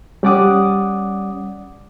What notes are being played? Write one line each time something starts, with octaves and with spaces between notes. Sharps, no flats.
G3 C#4 D5 F#5 D6 D#6